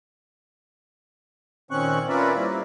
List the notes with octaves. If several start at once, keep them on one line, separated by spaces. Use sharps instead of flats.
A#2 D#3 C4 C#4 C#6 F#6
C#4 F4 A#4 B4 D5 E5
G3 A#3 C4 E4